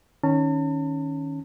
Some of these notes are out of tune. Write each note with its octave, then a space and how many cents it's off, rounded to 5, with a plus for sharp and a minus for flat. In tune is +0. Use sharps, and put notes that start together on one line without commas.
D#3 +0 C#4 +0 A5 +45